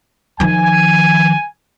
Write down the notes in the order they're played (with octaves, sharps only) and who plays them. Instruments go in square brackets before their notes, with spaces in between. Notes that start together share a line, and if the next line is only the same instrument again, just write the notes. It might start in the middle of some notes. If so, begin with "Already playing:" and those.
[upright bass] D#3 F3 [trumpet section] G#5